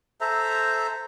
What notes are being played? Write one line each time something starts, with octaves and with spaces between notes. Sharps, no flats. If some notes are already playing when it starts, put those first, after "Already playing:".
A4 C5 E5 A#5